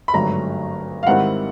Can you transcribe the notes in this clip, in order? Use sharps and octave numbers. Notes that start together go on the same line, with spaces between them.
B5
G#1 G2 D3 F#3 A3 A#5
F5
G#2 D#3 G3 C4 E4 F#5